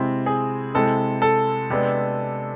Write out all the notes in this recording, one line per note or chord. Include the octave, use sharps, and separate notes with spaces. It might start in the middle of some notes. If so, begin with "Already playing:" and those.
Already playing: C3 G#3 C4 E4
G#4
C3 G#3 C4 E4 A4
A4
C3 G#3 B3 D4